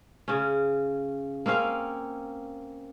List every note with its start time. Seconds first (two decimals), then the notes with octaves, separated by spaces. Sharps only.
0.28 C#3 C#4
1.46 A#3 C4 C#4 F5